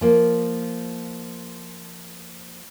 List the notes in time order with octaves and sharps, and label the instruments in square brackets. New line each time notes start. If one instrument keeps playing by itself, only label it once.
[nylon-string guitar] F3 A#3